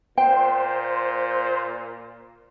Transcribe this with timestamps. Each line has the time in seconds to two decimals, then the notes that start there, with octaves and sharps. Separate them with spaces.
0.18 A#2 C5 G5